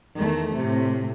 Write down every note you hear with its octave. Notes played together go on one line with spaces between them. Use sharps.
E2 D#3 A3
A2 C3